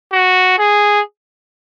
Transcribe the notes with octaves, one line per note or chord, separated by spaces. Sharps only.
F#4
G#4